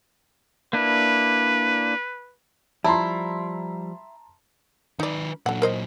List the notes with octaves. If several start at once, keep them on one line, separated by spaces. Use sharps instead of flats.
A#3 D4 E4 B4
F3 G3 E4 A5 A#5 C6
D#3 D#4 B4 D5
A#2 D3 F#3 F#5
A#4 C5 D#5